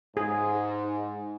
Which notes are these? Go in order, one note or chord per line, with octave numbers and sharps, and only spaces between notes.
G#2 G#4